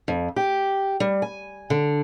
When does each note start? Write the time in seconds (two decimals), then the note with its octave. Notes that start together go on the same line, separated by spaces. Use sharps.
0.08 F2
0.36 G4
1.00 G3
1.22 G#5
1.70 D3